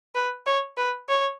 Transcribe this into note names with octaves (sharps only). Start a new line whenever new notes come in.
B4
C#5
B4
C#5